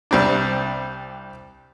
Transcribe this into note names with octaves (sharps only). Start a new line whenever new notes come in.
C2 G3 C4 D4